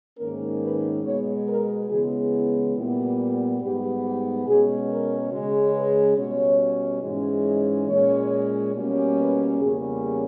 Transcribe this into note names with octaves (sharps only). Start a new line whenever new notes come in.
G#2 D#3 A#3 C#4 A#4
B4
B2 G#3 B3 C#5
A#4
C#3 E3 G#3 B3 G#4
E4
A#2 G3 B3 E4
G#2 G3 B3 G4
G4
B2 G#3 C#4 G#4
A#4
C#3 G#3 C#4
B4
B2 G3 C#4 C#5
G#2 E3 G#3 C#4
D#5
A#2 G#3 C#4 C#5
B2 G3 A#3 C#4
B4
E2 C#3 G3 A#3 C#4 G#4